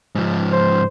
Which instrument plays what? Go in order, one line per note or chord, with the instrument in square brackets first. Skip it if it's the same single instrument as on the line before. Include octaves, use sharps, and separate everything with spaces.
[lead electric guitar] G#2 F3
[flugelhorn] C5